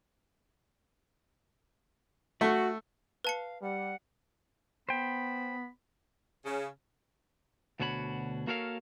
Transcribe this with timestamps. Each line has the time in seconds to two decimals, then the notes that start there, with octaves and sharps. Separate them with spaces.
2.41 A3 F#4
3.25 B4 F5 A5 C#7
3.62 G3 F#5
4.89 B3 C5 G5 B5
6.44 C#3
7.80 D2 B2 D4 F#4 C#5 B5
8.47 A#3 F#4 A4 A#4 C#5 F5